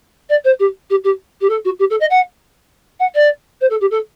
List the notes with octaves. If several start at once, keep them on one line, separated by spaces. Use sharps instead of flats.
D5
C5
G4
G4
G4
G4
A4
F#4
G4
A4
D#5
F#5
F#5
D5
C5
A4
G4
A4